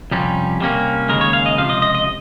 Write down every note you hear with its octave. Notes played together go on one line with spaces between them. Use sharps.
F2 C3 G3 C#4
C3 G3 A#3 C#4
D#2 C#3 G#3 A#4
C#5
F5
D#5
C#2 C3 F3 F5
D#5
D#5
D#5